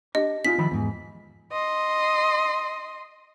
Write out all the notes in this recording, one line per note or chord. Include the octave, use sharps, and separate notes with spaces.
D4 G4 D#5
C#4 D#4 F4 B6
D#3 F3 B5
E2 G#2
D#5 C6